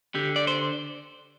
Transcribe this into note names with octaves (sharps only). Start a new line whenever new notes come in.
D3 G4
D5
C5